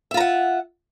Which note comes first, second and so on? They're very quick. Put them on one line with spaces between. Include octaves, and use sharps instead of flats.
E5 F4 A#5 F#5